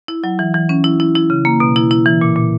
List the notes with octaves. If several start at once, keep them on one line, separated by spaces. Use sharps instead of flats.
E4
F#3
E3
E3
C#4
E4
E4
E4
C#3
A#3
B2
E4
E4
E3
A#2
A#2